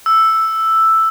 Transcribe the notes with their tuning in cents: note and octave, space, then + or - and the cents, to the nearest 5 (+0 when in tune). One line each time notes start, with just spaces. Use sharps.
E6 +0